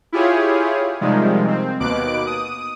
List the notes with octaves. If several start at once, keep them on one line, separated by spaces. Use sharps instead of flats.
E4 F4 G4 G#4 C#5
C3 D#3 F3 G3 G#3
C4
D#2 B2 D6 F#6 D7
D#6